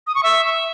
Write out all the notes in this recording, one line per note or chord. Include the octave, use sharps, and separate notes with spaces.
D#6
C#6
E5